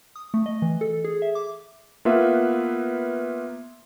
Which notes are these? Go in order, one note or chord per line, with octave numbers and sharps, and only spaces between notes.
D#6
A3
D#5
E3
A4
G#4
E5
D6
A#3 B3 F4 B4 E5